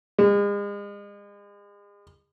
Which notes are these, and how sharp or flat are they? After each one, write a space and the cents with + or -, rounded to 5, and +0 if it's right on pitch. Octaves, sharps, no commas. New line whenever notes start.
G#3 -40